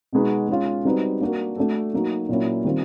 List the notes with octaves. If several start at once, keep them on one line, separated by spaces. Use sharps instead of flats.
B2 G#3 B3 D#4 F#4
G#3 C#4 F4
G3 C4 D#4 F#4 B4
A#3 D4 F#4 A#4
A3 D4 F#4 A4
F#3 A#3 D#4 F#4
A#2 F#3 A#3 C#4 E4
D#3 G3 C4 F4